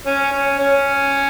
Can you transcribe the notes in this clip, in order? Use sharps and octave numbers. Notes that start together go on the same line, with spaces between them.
C#4
C#4
C#4